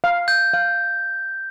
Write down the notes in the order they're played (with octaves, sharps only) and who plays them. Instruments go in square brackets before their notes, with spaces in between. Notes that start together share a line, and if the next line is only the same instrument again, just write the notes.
[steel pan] F5
[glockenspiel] G6
[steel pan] F5